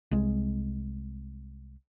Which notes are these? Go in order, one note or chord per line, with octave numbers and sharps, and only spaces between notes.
C2 G#3